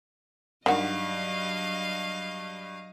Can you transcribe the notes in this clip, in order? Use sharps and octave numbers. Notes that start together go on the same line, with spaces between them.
G2 D#3 F#3 F#4 D#5 F5